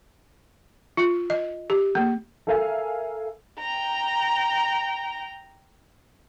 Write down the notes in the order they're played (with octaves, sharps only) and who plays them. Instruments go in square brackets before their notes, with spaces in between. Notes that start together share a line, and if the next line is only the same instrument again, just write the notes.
[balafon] F4
D#5
G4
A#3
[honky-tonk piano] A4 A#4 E5 F5 G#5
[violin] G5 A#5